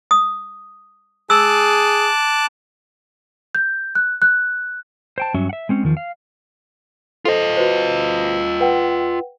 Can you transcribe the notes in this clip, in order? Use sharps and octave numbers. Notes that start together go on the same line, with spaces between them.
D#6
G#4 A5 D6 E6 F#6
G6
F#6
F#6
C5 G5 A5
G2 F#3 C#4 E5
E5 F#5
G#3 C4 C#4
E2 D#3 F3
F5
F4 A4 C5 D#5
F#4 B4 C5
B4 F#5 G5